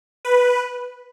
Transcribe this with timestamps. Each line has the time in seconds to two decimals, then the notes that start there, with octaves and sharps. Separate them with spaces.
0.25 B4